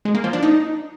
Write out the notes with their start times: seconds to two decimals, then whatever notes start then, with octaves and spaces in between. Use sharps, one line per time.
0.05 G#3
0.15 A#3
0.24 F3
0.33 D4
0.43 D#4